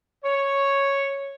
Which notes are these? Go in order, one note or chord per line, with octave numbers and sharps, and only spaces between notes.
C#5